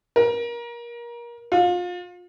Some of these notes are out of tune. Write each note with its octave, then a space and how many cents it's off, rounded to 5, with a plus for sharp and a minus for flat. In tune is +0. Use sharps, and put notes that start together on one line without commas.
A#4 +25
F4 +30